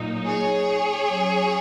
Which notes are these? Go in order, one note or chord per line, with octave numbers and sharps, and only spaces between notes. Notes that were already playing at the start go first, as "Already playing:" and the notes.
Already playing: A#2 F#3 D#4
G#4 C#5
F#3 C#4